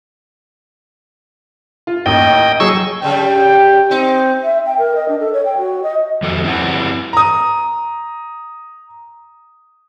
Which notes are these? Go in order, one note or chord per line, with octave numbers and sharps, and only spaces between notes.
F4
A1 D#2 D#5 G5
F#3 G#4 C#6 E6
G2 C#3 G3 G5
C4 D#4
E5
G5
A#4
D#5
D4
A4
C#5
G5
F#4
D#5
F2 D#3 F#4 A4
C4 E4 B4 F#5
A#5 D#6